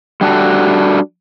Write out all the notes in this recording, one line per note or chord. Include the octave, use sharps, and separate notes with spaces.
G3 D4 F#4 A4